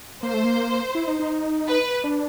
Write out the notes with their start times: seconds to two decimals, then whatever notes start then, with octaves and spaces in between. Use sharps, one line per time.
0.23 A#3 C5
0.34 A3
0.44 A#3
0.95 E4
1.07 D#4
1.19 D#4
1.68 B4
2.04 D4